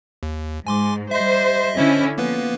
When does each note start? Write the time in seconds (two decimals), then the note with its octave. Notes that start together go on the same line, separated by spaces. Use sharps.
0.23 D#2
0.67 G#2 G#5 C6 D6
1.11 G3 C5 D#5 E5
1.77 D3 C#4 E4 C5 D#5 E5
2.18 F3 A#3 B3 B4